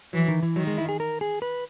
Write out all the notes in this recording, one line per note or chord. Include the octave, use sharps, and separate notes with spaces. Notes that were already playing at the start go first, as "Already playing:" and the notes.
E3 F#3
D#3
E3
D#3 F#3
G#3
E4
G#4
A#4
G#4
B4